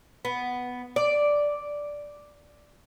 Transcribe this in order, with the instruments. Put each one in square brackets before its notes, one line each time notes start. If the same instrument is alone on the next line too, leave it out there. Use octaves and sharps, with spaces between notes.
[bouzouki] B3
D5